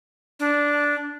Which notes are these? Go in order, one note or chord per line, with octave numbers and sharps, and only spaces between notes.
D4